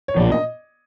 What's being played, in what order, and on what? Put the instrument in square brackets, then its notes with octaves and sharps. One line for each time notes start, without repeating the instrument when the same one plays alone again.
[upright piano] C#5
[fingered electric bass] B1 A#2 F3 [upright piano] D5
[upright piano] D#5